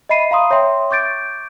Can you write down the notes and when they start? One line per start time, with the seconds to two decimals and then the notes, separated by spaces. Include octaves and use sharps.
0.09 D#5 E5 B5 C7 D#7
0.31 F5 A#5 C6 D#6
0.51 C#5 E5 G5 C6
0.91 C#6 D6 G6 A6 D7